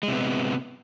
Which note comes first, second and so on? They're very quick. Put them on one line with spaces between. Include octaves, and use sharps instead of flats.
G#3 C3 B3